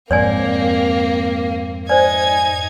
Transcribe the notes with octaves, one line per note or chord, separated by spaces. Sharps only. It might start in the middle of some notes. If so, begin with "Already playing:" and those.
F2 G#2 A#3 C4 C#5 D5 G#5
D#4 C5 D5 G#5 G#6